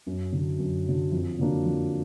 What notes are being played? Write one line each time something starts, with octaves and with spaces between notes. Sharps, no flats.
F#2
D3 F#3
F#2
D3 F#3
F2
D3 F#3 A#3 D4
F2